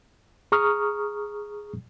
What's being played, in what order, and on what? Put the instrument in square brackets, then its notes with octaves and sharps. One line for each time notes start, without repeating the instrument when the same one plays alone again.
[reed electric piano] G#4 A#5 C#6 D#6 F6